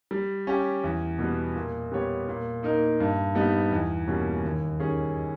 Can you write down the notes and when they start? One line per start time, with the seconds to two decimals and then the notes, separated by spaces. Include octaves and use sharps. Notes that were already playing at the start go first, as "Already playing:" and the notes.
0.11 G3
0.47 C#4 G4
0.84 E2
1.19 B2 G3 B3
1.55 A#2
1.92 G3 B3 G4 C#5
2.28 A#2
2.63 A#3 D#4 A#4
3.00 G2
3.35 G3 B3 D#4
3.72 E2
4.08 B2 G3 A#3 C#4
4.44 D#2
4.80 D#3 G3 C#4 G#4